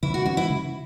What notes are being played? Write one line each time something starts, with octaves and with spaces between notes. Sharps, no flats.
C#3 E4
F#4
E3 G#3 C#4 F#4
E4
C#3